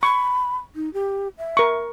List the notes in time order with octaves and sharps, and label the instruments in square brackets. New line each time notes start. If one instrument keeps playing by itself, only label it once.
[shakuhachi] B5 [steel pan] C#6
[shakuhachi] D#4
G4
E5
[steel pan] A#4 C#6